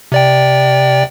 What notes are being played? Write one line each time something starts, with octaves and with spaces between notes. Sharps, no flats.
C3 D5 G5